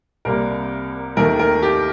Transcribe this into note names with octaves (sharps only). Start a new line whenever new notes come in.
C2 C3 G3 A#3 A#4
D#2 D#3 A3 A#4
A#4
G4